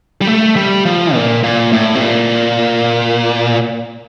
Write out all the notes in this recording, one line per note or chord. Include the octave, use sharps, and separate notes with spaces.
G3
A3
G3
F3
A#2
A#2
A2
C3
A#2